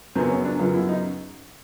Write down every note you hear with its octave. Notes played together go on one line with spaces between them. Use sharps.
F#2 C#3 F#3 B3 C4
C#4
D4
F#2 C#3 F#3 B3 F4
E4
D#4